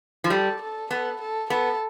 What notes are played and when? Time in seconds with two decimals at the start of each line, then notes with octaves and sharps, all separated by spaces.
0.24 F3
0.30 G3 A4
0.61 A4
0.91 B3 A4
1.21 A4
1.50 B3 A4